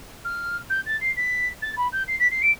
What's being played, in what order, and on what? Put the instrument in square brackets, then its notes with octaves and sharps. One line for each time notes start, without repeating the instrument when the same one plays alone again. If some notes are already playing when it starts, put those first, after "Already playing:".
[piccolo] F6
G6
A6
C7
B6
A6
B5
G6
C7
B6
C7
D7